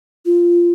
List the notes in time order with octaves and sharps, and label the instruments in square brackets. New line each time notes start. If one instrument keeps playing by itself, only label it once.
[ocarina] F4